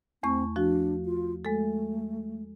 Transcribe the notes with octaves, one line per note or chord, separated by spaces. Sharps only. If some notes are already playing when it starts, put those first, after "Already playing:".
E2 A3 C4 C#6
F3 D4 F#4
F4
G#3 A3 A4